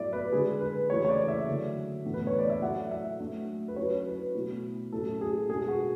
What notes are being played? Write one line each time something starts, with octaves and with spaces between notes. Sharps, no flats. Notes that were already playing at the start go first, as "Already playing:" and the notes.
Already playing: A2 F#3 B3 E4 D5 E5
B4
D3 G#3 D4 G#4
B4
C#3 E3 A3 E4 C#5
C#5
D5
E5
D3 F#3 A3
A2 E3 B3 D4
B4
C#5
D5
E5
F#3 A3 E4 F#5
E5
F#3 A3 D4
B4
F#3 C#4 E4 C#5
B4
B2 A3 E4
A2 F#3 C#4 E4 A4
G#4
B2 G#3 B3 D4 G#4
F#4